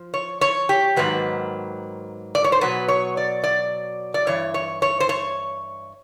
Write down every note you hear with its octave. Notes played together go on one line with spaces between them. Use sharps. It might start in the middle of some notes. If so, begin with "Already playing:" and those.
Already playing: F3
C#5
C#5
G4
G#2 D#3 F#3 A#3 B4
D5
C#5
C5
B2 F#3 B3 B4
C#5
D5
D5
D5
G2 E3 C#5
C#5
C#5
C5
C#5